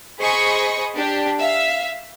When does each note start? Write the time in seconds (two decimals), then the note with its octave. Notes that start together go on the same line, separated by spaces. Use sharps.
0.20 G#4 C5 D#5 B5 C#6 D#6
0.96 D4 G4
1.39 E5 F5